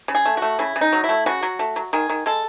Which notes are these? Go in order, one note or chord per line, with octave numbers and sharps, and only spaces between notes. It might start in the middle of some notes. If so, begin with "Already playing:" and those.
C#3
G#4
A3
A3 F#4
C#3 E4
C#3
D#4
F#3
E4
A3
C#3 F#4
F#3
A3
F#3
D#3 G#4
D#3
G#3 A4